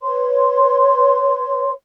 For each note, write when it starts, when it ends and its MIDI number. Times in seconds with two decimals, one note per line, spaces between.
0.01 1.71 71
0.01 1.71 73
0.01 1.71 84